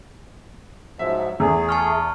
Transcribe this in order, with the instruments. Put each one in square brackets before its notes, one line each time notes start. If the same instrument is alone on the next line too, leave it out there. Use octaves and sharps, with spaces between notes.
[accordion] G#2 F3 F#3 [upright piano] E5
[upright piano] E2 [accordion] A3 G#4
[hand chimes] A5 C#6 F6